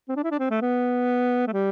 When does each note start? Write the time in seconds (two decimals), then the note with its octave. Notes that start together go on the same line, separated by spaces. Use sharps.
0.09 C4
0.16 D4
0.24 E4
0.31 D4
0.39 C4
0.50 A3
0.61 B3
1.47 A3
1.53 G3